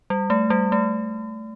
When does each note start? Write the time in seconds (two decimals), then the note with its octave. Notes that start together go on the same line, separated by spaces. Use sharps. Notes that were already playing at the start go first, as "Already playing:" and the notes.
0.10 G3
0.30 A3
0.50 G3
0.72 A3